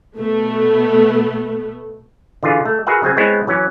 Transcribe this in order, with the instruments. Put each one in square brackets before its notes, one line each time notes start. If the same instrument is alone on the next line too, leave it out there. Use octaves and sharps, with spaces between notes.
[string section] B2 A3 B3
[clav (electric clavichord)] D3 E3 F4 G#4
A3
F#4 G#4 A#4 B4 E5 F#5
C#3 F#3 C4 G#5
G#3 B3 C4 E4 C#5
E3 F#3 C#4